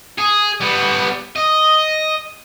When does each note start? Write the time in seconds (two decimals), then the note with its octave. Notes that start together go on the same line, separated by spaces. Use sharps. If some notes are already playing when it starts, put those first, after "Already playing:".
0.18 G#4
0.61 G3 B3
1.36 D#5